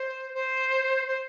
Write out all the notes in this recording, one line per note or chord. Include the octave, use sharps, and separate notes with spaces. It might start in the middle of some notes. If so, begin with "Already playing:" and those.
Already playing: C5
C5
C5